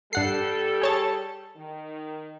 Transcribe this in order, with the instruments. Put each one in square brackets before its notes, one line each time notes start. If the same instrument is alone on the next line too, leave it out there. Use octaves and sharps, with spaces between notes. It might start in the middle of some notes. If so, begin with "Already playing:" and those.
[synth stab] G2 F#5 C7 [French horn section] G3 G4 A4
[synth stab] G#4 C#5 A5
[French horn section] D#3